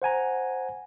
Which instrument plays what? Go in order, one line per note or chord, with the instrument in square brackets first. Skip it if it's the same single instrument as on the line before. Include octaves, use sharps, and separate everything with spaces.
[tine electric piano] C5 F#5 G#5 A#5